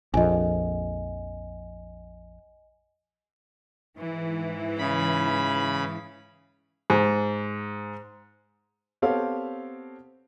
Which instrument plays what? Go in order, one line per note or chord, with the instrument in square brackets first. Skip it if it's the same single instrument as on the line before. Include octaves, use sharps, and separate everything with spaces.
[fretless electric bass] A#1 F2 [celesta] D#5 G#5
[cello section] G#2 E3
[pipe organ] C#3 B5
[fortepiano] G#2
[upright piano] B3 C4 G4 A4 C#5 F5